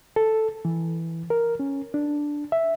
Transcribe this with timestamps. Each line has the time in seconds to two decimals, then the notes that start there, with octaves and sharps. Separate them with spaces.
0.16 A4
0.65 E3
1.30 A#4
1.60 C#4
1.94 D4
2.52 E5